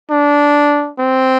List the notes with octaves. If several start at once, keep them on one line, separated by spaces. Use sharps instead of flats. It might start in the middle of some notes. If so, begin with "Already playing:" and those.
D4
C4